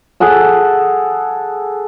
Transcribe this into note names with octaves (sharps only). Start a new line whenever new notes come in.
G#4 A4 F#5 A5